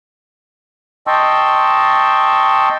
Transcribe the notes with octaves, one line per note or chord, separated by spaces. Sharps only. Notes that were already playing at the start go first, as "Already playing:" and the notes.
D#5 G5 A5 C6 C#6 E6